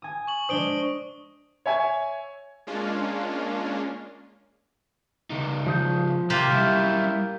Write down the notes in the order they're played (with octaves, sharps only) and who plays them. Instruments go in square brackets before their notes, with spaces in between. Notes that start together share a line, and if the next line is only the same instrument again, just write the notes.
[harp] G#5 D#6
[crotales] C#6 F#7
[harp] G#3 D4 C5 [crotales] D#6 D7 G7
[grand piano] C#5 E5 G#5 G#6
[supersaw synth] G#3 A#3 C#4 D4 F4
[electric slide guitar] C#3 D#4
[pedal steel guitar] F3 D#6 G6
[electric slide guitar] C3 [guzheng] A#3 F4 G4
[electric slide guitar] G3 C#4 E5 [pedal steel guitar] E4